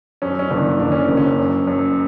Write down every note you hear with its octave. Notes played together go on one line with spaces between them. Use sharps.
F#2 C#4
C#4
F#1 D4
F#1 D4
C#4
F#1
C#4
F#2
F#2